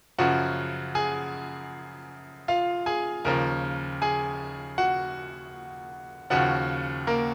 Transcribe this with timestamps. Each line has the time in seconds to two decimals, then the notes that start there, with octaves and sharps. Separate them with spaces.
0.18 F#2 C#3 F3 F#4 F#5
0.95 G#4 G#5
2.48 F4 F5
2.86 G#4 G#5
3.25 D#2 C#3 F3 A#4 A#5
4.02 G#4 G#5
4.78 F#4 F#5
6.30 D#2 C#3 F3 F#4 F#5
7.07 A#3 A#4